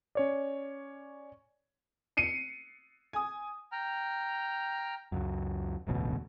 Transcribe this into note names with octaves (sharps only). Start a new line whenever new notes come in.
C#4 C#5 D5
C7 C#7 D#7
G#5 D#6
G5 A#5 F6
C#2 F#2
E1 A1 D2 B2